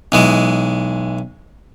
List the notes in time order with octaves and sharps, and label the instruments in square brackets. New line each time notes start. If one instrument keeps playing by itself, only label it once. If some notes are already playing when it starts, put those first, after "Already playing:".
[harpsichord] B1 E3 G#3